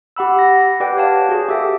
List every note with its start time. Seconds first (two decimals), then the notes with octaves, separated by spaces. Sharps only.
0.16 G4 F#5 B5 E6
0.39 A#6
0.80 G4 B4 D5 F#5 G5
0.97 C#5 D5 F5 G5 A5
1.29 F#4 G#4
1.49 G4 A4 E5 G5